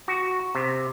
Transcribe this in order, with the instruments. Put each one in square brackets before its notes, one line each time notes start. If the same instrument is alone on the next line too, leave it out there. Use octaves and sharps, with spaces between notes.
[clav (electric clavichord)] F#4
C3